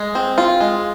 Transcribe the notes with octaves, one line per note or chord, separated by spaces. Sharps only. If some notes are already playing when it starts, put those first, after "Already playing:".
Already playing: G#3
C4
F4
G#3